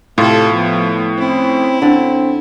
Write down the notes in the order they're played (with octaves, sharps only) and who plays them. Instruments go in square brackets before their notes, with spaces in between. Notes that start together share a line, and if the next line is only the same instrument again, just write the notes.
[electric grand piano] A2 [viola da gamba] C3 G4 A4 [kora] F4
[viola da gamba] F3 A3 B3
[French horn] C4 [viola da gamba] C#4 E4
[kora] D3 [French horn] C4